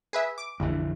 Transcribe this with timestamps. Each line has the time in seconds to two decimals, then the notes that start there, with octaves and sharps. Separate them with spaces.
0.13 G#4 B4 E5
0.38 D6
0.60 A#1 F2 D3 E3